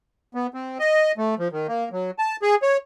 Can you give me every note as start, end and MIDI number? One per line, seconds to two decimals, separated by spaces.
0.34 0.47 59
0.54 0.78 60
0.79 1.12 75
1.18 1.35 57
1.39 1.48 53
1.52 1.67 51
1.68 1.89 58
1.92 2.11 54
2.19 2.36 81
2.42 2.55 68
2.62 2.77 73